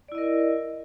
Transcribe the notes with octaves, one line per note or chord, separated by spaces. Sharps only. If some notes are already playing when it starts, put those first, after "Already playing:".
E4 A#4 D5 D#5